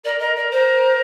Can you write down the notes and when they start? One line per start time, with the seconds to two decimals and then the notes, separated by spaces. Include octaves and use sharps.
0.04 A#4 D5
0.20 A#4 D#5
0.36 A#4 D5
0.51 A#4 C5